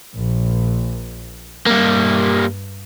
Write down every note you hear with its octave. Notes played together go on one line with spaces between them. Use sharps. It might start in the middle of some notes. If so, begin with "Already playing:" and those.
A#1 A#2
G2 G3 A#3